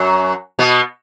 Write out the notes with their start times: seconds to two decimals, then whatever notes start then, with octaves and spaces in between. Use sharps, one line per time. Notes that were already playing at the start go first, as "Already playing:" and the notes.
Already playing: F#2 F#3
0.59 B2 B3